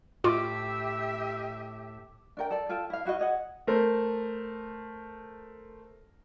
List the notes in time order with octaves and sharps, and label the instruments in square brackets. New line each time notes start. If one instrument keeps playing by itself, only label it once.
[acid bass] A2 [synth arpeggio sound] F4 [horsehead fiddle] G4 E5 [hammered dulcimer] D6
[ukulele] D4 A#4 G5
A4 D5
F4 A4 G5 A5
E4 F5
E4 F#4 G4 D#5
G#4 D#5 F#5
[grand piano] A3 A#4 C5